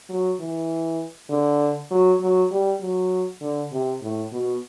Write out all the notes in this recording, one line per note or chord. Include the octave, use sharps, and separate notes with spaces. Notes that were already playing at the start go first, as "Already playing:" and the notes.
F#3
E3
D3
F#3
F#3
G3
F#3
D3
C3
A2
B2